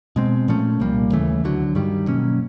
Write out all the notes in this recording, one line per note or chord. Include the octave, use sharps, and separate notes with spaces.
B2 G#3 C4
A#2 F3 A3 C#4
C2 A#2 G3 A#3
D#2 C#3 E3 A3
D2 D3 F#3
G2 D#3 G3
B2 F#3 A#3 C#4